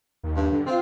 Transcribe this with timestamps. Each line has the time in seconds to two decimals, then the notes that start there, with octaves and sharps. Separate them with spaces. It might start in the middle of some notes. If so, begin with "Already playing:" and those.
0.23 D#2
0.36 G2
0.52 D3
0.67 C4 F4